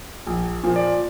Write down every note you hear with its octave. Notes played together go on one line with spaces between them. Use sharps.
A#1
A#2 F3
D5